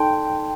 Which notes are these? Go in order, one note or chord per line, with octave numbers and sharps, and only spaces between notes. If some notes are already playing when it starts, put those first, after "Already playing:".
Already playing: D#4 A4 D5 G5 A5 C6